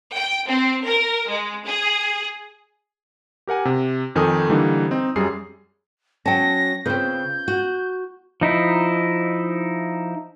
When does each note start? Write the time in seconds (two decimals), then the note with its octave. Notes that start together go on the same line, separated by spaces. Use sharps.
0.15 G5
0.48 C4
0.86 A#4
1.28 G#3
1.66 G#4
3.47 G4 A#4 F#5 G#5
3.65 C3
4.15 F2 D#3 A4 G#5 D#6
4.50 D3 E3 G3 A#3 D#4
4.91 C4 D#4
5.16 F#2 G3 G#4 C7
6.26 F#3 C#4 C5 G5 A5 A#6
6.86 C#3 C4 C#4 F4 B4 G6
7.48 F#4
8.41 F3 D#4 E4